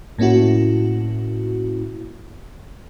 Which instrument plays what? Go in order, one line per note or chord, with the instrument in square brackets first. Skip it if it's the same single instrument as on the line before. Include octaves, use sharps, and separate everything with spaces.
[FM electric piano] A2 A#3 C#4 E4 F#4